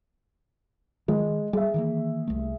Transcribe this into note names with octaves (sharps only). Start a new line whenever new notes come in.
D#3 G#3
G3 G#4 E5
D#3 E3 A#3
C2 A3